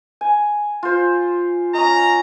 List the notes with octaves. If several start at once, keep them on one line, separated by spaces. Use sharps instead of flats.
G#5
F4 C5
C#4 D#5 A#5